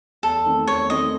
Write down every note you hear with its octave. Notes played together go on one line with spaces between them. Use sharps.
E2 A4
D#3 A3 C4
E2 C#5
D#3 A3 C4 D#5